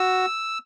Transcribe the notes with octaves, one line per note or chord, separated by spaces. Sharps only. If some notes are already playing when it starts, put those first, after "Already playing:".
Already playing: F#4 E6